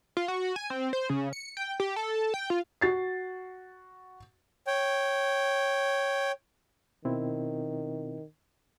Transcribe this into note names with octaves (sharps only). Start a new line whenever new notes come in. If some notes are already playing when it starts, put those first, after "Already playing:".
F4
F#4
G#5
C4
C5
C#3
C#7
G5
G4
A4
G5
F4
F#4 A6 C7
C#5 G5
B2 D#3 C4 E4